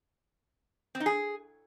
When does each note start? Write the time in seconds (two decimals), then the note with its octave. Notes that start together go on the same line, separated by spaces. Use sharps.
0.95 C4
1.00 D#4
1.06 G#4